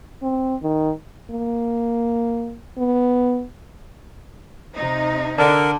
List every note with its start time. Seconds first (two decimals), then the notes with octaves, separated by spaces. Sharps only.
0.22 C4
0.62 D#3
1.31 A#3
2.78 B3
4.76 C3 D#4
5.38 D3 A#4 A5